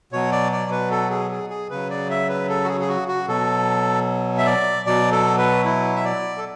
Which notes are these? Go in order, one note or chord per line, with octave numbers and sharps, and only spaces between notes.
B2 F#3 C#5
D5
D5
B4
A4
G#4
G#4
G#4
C#3 F#3 B4
D5
E5
B4
A4
F#4
G#4
G#4
F#4
F#4
B2 F#3 A4
E5
D5
B2 F#3 D5
A4
B4
E4
E5
D5
A4